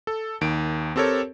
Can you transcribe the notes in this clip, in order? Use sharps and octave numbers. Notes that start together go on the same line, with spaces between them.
A4
D#2 D#3 D7
C4 G4 A4 A#4 C#5